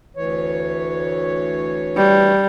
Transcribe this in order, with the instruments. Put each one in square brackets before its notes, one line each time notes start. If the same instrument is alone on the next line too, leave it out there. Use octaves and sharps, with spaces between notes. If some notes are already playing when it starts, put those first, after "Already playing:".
[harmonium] D2 E3 C#5
[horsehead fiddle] G3